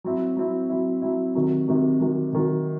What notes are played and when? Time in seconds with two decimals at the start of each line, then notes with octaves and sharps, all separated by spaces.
0.04 F#3 C4 E4
0.37 F#3 C4 E4
0.69 F#3 C4 E4
1.02 F#3 C4 E4
1.35 C3 D#3 F#3
1.68 C3 D#3 F#3
2.00 C3 D#3 F#3
2.33 C3 D#3 F#3